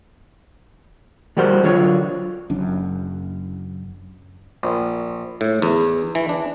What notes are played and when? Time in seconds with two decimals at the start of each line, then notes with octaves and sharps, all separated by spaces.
1.37 E3 G3 G#3 F#4 A#4 C5
1.64 D3 F#3 F4 C#5
2.50 F#1 F#2 D4
4.63 A#1
5.41 A2
5.62 E2
6.15 E3
6.29 D4